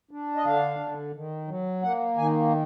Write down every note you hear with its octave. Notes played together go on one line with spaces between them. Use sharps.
D4
D#5
D3 F5
D3
D#3
F#3
A#3 F#5
D#3 G#5